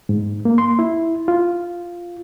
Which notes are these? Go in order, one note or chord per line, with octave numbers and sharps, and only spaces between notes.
G#2
A#3
C6
E4
F4